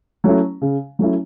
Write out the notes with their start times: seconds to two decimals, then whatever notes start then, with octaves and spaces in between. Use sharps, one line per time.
0.24 F#3 A3 C#4 E4
0.61 C#3
0.99 F#3 A3 C#4 E4